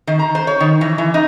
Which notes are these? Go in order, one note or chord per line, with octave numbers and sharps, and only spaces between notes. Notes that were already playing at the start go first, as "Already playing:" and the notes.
D#3
A#5
C5
C#5
D#3
E3
E3
D#4